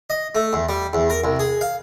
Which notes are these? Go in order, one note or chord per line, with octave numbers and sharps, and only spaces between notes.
D#5
A3
E2
G3
E2
A#4
C2
G#4
F5